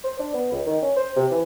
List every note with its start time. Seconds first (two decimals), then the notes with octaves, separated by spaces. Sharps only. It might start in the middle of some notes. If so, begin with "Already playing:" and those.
0.04 C5
0.19 D4
0.34 B3
0.52 C#2
0.66 D#3
0.82 C#4
0.96 C5
1.16 C3
1.31 E3